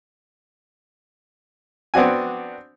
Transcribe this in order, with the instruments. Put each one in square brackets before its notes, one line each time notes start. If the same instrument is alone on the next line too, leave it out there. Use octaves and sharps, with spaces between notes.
[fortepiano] B3 C4 D4 F#4 G#5